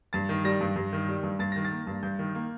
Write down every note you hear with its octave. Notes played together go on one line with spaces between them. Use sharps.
G2 A6
D#3
G3 A#6
G2
G2
D#3
G3
G2
G2 A6
D#3 A#6
A6
A#3
G2
G2 G6
D#3
A#3